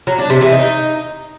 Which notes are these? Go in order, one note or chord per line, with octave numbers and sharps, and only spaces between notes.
F#3
D4
C3
E3
D#4